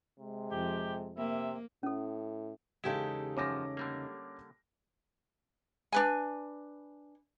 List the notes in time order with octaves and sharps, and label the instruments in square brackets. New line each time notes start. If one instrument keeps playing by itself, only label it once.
[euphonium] C3 [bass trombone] G#3
[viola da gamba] F2 [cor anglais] G4
[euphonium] C3 [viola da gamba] A#3 [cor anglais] E5
[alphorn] A2 [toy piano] C#4 A4
[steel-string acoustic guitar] E2 C#3 D#4 [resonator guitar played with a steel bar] G#3 G4 A4 [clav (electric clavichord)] E4
[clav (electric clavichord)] F#2 F3 [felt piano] C#4 D6 A#6
[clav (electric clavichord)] D3 G3 A#3
[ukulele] D4 B4 G#5